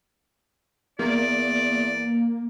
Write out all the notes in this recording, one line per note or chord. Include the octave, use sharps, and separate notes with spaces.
E2 A#3 D5